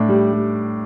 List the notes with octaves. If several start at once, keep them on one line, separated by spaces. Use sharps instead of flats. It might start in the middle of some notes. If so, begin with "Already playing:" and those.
Already playing: A2 D4
G3
G3